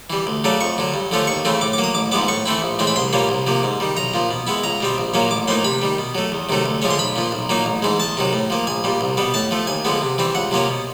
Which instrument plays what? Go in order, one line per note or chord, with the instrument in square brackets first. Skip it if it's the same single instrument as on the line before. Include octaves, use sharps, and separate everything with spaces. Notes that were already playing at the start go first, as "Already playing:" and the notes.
[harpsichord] E3 G3
D2
C#3 F#3 A3 D4
F2 C#6
D3 F#3
G2
D3 F3 A3 C#4
D#2 C#6
C#3 E3 A3 C4
A2 D6
D6
F#3 A#3
D#6
A1 D6
G#2 F3 G#3 B3 D6
A2 C#6
E3 A3 C4 E4
A#1
A2 E3 G#3 C4
B5
C2 C6
A#2 G3 A#3 C#4
C2
C3 F3 A#3
G#2
D#3 G3
B1 A#5
A#2 F3
B2
G#3 B3 E4
C#2 A#5
B2 G3 C4
A#1
A#2 F#3 A#3 C#4
A1 D6
A2 F3 A#3 D#4 C6
C3 B5
D#3 G3
B2
F#3 A3
E2
C3 D#3 F#3 A3
D2
D3 F3 G#3 C#4
C6
B1 B5
A#2 F3
B1
A#2 F#3 A#3 D#4
A1
G#2 E3 G#3
E2 A5
C3 D#3 F#3
A2
F3 A#3
A#1 G#5
A#2 G3
C2
B2 G3 B3
A2 A5
F3 A3
D#2 G#5
D3 F3 G#3 B3
C3
E3 G3 C4
C#2 F#5
C3 F3 A#3 C#4
B2